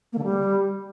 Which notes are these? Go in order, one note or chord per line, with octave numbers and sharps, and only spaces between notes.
A#3
D3
G3